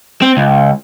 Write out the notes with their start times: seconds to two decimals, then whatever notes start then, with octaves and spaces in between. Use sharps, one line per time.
0.22 C4
0.37 C#2